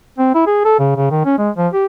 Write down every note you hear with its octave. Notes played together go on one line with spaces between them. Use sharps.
C4
E4
G#4
A4
C#3
C#3
D#3
C#4
G#3
F3
G4